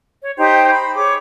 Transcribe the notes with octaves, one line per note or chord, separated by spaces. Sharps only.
C#5
D#4 G4 C5 G5
B5
G#4 C#5 D6